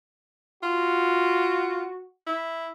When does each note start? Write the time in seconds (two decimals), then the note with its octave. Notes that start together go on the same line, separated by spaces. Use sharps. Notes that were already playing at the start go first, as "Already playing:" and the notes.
0.63 F4 F#4
2.27 E4